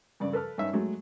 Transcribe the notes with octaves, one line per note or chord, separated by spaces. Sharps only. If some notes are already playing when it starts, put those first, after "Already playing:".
G2 C#3 D5
A4 B4 A5 F6
G2 C#4 D#4 E5
F#3 G#3 A3